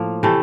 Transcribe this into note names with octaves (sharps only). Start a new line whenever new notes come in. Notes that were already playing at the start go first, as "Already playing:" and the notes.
Already playing: A2 F3 A#3
C3 E3 A3